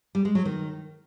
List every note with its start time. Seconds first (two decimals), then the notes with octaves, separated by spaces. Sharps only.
0.15 G3
0.25 G#3
0.35 F#3
0.45 D#3